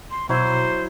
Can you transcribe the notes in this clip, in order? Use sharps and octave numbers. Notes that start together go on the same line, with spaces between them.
C6
B2 F#3 E4 C5